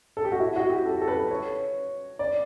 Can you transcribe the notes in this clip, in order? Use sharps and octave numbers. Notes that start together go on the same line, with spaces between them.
A4
G4
F#4
E4
F#4
G4
A4
A4
B4
C#5
D5